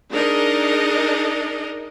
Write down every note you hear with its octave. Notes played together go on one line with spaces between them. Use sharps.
D4 D#4 G#4 A#4 D#5